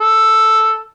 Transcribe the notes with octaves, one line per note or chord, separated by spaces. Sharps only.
A4